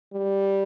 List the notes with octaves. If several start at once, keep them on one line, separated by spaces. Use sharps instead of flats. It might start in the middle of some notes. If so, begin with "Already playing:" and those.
G3